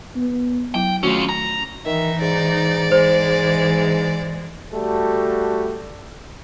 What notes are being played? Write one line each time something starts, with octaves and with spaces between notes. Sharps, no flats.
B3
F#3 E4 G5
D#3 A3 C#4 F4 F#4
A#5
D#3 E3 D#4 E5
G#2 D5
E3 G#3 C5
G3 A3 F#4 A4